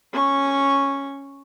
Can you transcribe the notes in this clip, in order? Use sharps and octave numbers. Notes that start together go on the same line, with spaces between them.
C#4 C#6